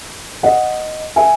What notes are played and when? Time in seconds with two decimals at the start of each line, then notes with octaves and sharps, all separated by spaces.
0.43 D#5 F#5
1.16 E5 G#5